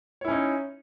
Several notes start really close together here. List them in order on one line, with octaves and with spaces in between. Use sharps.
C#5 E4 C#4 D#4